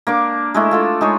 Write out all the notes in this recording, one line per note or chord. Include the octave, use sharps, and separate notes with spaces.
A#3 D4 D6
G#3 A3 E4
F4 A4 D5
G#3 D#4 G#4 C#5